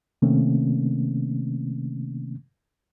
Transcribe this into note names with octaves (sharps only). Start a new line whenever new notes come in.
C3 D#3 A3 A#3 C4 C#4